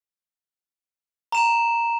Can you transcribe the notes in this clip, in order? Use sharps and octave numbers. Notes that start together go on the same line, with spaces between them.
A#5 E7